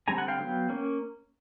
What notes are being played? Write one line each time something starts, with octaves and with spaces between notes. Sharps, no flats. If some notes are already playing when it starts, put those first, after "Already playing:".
D3 G3 C4 G#5 A#5
F#5 G#5
F5 G5
F#3 B3
A#3 C#4